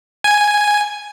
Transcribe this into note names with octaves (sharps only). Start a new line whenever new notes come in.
G#5